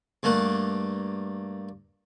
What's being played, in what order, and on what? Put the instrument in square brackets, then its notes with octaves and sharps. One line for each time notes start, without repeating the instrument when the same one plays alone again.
[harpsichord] G2 A3 A#3 F#5